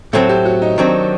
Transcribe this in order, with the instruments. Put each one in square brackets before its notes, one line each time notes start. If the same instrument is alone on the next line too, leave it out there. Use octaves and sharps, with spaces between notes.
[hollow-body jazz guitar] A2 F#3 C4 [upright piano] A4
[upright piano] G4
F#4
D#4
[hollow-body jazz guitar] D#3 F#3 C4 [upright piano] D4